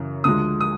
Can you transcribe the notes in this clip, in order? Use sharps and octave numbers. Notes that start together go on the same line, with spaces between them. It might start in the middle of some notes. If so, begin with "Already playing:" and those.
Already playing: F#2 C#3 E3
D2 D3 F3 G#3 D#6
D#6